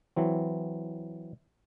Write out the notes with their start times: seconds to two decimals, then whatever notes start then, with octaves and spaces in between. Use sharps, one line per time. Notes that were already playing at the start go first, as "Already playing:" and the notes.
0.16 E3 F#3 C4